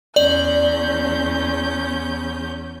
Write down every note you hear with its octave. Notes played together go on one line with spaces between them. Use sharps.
E2 C#4 D5 G6 F#7